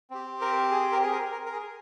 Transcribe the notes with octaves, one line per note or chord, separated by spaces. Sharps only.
C4 G4
A#4
G#4
A#4
G#4
A#4
A#4
A#4
G#4